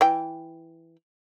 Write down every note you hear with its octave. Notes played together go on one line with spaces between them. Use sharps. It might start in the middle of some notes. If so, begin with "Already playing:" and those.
E3 G5